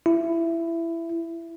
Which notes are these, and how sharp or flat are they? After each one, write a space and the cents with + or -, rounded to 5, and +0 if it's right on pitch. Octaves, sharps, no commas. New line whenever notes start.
E4 +15